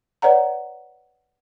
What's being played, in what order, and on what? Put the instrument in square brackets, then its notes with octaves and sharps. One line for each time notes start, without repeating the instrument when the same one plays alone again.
[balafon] B4 C#5 D5 F#5 A#5